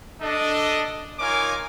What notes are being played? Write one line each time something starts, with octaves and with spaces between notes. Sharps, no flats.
D4 A4 D#5
D#4 F4 A#4 C#5 G#5 D6